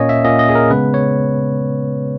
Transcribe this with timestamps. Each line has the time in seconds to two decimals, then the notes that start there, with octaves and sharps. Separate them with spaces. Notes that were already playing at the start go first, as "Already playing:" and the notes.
Already playing: A#2 A#3 C#4 C#5 D#5
0.09 E5
0.24 A#2 A#3 C#4 D#5
0.39 D#5
0.49 G#4
0.55 A#4
0.70 C#3 G#3 B3 B4
0.94 C#5